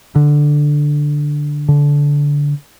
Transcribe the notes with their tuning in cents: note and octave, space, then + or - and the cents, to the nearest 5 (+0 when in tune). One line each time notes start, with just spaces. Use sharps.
D3 +5
D3 -20